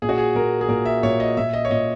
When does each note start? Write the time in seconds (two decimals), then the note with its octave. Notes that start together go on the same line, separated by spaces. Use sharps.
0.02 A#2 G#4
0.09 F#4
0.18 G#4
0.35 A#2 A#4
0.61 G#4
0.68 A#2 A#4
0.86 E5
1.03 A#2 C#5
1.20 D#5
1.37 A#2 E5
1.53 D#5
1.65 C#5
1.70 A#2 D#5